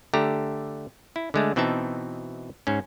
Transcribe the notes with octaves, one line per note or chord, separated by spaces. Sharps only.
D3 A3 G4 A#5
E4
D3 G#3 A3
B2 E3 C4 D#4 E5 A5
G#2 C#4